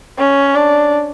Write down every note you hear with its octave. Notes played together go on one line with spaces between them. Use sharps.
C#4
D4